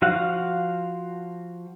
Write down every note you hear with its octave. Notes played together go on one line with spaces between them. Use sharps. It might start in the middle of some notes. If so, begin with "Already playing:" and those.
F3 F#4 F5 F#5